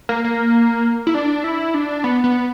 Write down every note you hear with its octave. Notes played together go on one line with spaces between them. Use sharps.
A#3
A#3
E4
D4
E4
D4
B3
B3